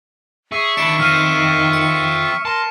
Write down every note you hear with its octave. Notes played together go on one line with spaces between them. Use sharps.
G#4 E5 C#6
D#3 D4 E4 C#7 D7 E7
F3 C4 F6 D#7
C#7
A#4 A5 C6